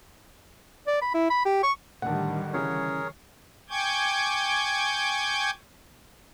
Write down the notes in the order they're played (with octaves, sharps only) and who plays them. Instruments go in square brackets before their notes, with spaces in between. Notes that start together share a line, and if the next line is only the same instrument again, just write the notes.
[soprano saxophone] D5
B5
E4
B5
G4
C#6
[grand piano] A2 D4 A5 [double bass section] D3 D#3 G3 [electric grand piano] F#5
[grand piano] C#3 E3 C#4 [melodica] G#4 A#4 C#5
[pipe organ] G5 G#5 C#6 D6 G6 G#6